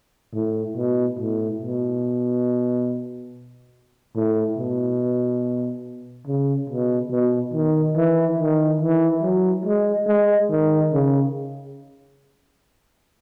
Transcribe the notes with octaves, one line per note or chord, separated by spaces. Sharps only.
A2
B2
A2
B2
A2
B2
C#3
B2
B2
D#3
E3
D#3
E3
F#3
G#3
G#3
D#3
C#3